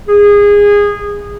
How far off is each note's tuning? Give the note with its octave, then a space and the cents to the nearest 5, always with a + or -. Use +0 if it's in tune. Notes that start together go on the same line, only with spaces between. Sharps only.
G#4 -20